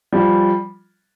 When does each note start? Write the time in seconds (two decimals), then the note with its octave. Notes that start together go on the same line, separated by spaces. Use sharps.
0.12 F3 G3